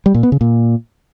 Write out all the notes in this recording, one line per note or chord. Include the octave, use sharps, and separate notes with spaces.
G3
A#2
B3
C#3
A#2